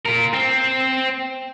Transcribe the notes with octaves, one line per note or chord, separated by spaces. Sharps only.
F4 A#4
C4